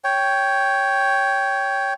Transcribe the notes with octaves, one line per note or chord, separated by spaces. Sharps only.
C#5 G5